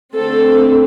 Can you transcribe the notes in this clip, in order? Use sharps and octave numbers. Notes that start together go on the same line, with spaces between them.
D3 A3 C4 A4